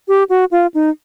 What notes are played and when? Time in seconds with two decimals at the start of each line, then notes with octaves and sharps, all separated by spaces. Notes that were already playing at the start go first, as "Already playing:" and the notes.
0.08 G4
0.30 F#4
0.51 F4
0.74 D#4